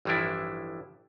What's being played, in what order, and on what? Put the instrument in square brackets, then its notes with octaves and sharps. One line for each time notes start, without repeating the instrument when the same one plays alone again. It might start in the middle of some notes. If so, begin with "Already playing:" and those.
[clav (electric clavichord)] A1 G2 E3 F3 D4 E4